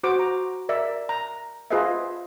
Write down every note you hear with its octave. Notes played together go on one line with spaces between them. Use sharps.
F#4 C5 D6
A#5
A#4 D5 E5
A#5
F4 G#4 B4 C5 D#5 E5